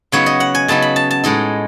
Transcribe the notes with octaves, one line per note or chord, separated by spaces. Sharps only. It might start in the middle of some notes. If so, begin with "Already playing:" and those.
C#3 F#3 B3 D#4 C#5
D#5
F#5
G#5
C#3 F#3 B3 D#4 A5
B5
A5
A5
A2 G#3 D#4 D#5